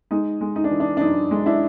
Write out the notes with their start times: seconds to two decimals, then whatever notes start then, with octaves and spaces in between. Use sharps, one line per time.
0.11 G#3 D#4
0.41 G#3
0.56 D#4
0.64 D4
0.71 E3
0.80 D4
0.97 D4
1.01 F#2 D#4
1.31 G#3
1.46 D4 E4